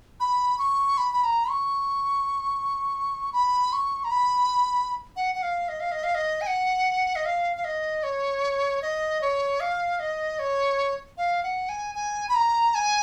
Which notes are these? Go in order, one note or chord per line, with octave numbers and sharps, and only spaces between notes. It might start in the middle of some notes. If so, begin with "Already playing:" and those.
B5
C#6
B5
B5
A#5
C#6
B5
C#6
A#5
B5
F#5
F#5
F5
D#5
F5
D#5
F5
D#5
G#5
F#5
D#5
F5
F5
D#5
C#5
D#5
C#5
F5
D#5
C#5
F5
F#5
G#5
G#5
B5
A#5
G#5